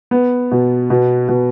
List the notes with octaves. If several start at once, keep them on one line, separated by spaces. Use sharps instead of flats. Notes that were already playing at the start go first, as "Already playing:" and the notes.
B3
B2
B2
B2